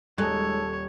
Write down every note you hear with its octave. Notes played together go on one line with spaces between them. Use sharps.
D#1 G#3 D#4 A4 C#5 F#6